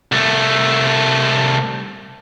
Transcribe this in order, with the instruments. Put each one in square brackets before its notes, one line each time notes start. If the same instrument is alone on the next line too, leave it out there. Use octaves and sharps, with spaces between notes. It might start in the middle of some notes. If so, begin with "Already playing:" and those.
[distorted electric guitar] C2 A3